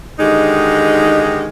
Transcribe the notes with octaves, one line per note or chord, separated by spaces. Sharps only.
D3 D#3 G#3 D#4 G4